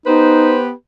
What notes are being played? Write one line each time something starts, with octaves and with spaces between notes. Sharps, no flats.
B3 D#4 G4 B4 C5